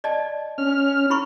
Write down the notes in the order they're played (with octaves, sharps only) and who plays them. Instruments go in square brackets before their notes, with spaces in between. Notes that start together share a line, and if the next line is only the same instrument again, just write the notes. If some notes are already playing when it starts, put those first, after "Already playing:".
[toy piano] D5 D#5 A5
[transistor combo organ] C#4 F6
[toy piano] E4 B5 C#6